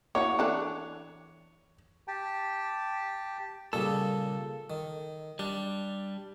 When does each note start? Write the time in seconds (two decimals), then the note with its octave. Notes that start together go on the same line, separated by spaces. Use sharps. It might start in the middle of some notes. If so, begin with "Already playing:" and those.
0.15 A#3 E4 F#4 C#5
0.39 E3 D4 A4
2.08 G4 G5 A5
3.73 A#2 C#3 G3 A4
4.70 D#3
5.39 G3 D4